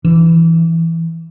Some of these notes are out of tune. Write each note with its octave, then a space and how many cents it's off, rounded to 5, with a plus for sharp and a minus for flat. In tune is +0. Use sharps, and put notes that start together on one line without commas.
E3 +5 D4 +5